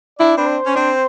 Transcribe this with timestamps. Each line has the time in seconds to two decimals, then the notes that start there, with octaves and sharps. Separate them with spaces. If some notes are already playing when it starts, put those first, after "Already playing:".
0.19 D4 E4 D5
0.37 C4 D4 B4
0.46 C5
0.66 C#4
0.74 C4 D4